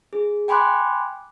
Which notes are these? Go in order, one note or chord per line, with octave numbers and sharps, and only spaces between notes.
G#4
G5 G#5 B5 C6 D6 F#6